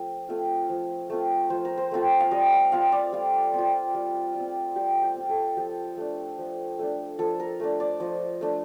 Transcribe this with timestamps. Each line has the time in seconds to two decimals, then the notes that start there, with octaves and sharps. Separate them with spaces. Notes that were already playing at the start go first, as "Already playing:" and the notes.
Already playing: F3 A3 C4 F4
0.29 A3 C4 F4
0.69 F3
1.10 A3 C4 F4
1.50 F3 C5
1.65 A#4
1.78 C5
1.91 A3 C4 F4
2.20 F5
2.31 G3 D#5
2.53 F5
2.72 C4 F4 F5
2.92 D5
3.12 G3 F4
3.53 C4 F4
3.94 G3
4.35 C4 F4
4.76 G3 G4
5.03 G4
5.16 C4
5.21 F4
5.29 A4
5.57 F3 G4
5.97 A3 D4
6.38 F3
6.79 A3 D4
7.19 F3 A4
7.40 A#4
7.60 A3 D4
7.80 D5
8.00 F3 D#5
8.41 A3 D4